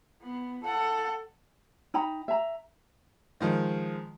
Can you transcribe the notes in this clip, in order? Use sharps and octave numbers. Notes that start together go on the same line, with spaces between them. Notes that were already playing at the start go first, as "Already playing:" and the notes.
B3
A4 F#5
D#4 G5 A#5 B5
E5 A#5
D#3 F3 G#3